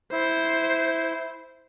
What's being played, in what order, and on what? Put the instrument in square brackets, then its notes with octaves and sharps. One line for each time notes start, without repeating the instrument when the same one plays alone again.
[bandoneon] E4 [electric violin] C5